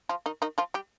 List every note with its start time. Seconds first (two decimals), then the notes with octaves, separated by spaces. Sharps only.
0.09 F3 F4
0.26 D#3 D#4
0.42 D#3 D#4
0.58 F3 F4
0.74 G3 G4